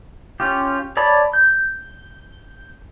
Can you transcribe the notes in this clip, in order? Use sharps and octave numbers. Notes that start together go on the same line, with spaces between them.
C#4 F4 G4
C#5 D5 A5 B5
G6